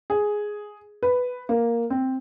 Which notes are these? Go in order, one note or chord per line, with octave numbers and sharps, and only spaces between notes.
G#4
B4
A#3
C4